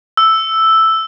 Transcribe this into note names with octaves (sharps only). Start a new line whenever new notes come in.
E6